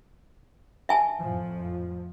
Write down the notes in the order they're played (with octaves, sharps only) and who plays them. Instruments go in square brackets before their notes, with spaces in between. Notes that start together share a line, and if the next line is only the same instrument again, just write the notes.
[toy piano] E5 G#5 A5
[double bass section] F2 A2 F3